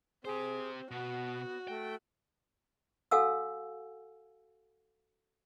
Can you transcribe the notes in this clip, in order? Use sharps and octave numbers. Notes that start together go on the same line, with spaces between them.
C4 G4 G#4 C5
B2 B3 F#4
A3 G5
F#4 A4 F5 F#5 G#5 E6